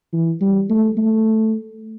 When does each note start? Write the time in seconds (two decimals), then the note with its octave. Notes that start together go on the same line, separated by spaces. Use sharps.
0.13 E3
0.41 G3
0.70 A3
0.97 A3